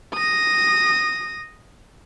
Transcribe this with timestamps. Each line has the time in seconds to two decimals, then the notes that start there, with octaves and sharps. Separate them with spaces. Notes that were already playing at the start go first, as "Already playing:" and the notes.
0.14 D#6 A#6